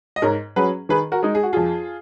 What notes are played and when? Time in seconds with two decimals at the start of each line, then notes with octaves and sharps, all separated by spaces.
0.16 D#5
0.22 G#2 A#4 C#5
0.56 F#3 C#4 G#4 B4
0.89 D#3 G#4 B4
1.12 F#4 A#4
1.23 G#3 D#4
1.35 G#4
1.43 F#4
1.53 F2 F4 G#4